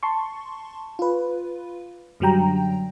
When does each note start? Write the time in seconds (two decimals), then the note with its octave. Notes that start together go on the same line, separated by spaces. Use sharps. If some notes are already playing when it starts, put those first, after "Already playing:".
0.03 A5 C6 C#6
0.99 F4 B4
2.20 F#2 D3 F#3 G3 G5 A#5